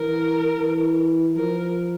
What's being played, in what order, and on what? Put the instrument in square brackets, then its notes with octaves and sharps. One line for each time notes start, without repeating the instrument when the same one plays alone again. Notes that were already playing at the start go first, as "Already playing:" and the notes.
Already playing: [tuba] E3 [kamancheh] A#4
[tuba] E3
[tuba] F3 [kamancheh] A#4